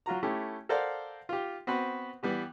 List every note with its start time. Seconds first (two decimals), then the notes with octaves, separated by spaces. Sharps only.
0.06 F#3 F4 F#4 A#5
0.23 A3 C#4 E4 G4
0.69 A4 A#4 C5 D5 F5 F#5
1.29 F4 G4
1.67 B3 C4 F#4 B4
2.23 E3 G3 B3 G4